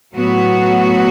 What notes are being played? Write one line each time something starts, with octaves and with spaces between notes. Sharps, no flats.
A2 F#3 B3 F#4